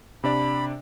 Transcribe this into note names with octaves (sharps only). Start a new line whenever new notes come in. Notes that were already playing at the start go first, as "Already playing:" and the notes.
C3 D4 D5 B5